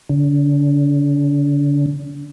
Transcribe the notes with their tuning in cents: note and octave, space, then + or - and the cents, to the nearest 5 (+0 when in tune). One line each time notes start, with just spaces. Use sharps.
D3 -40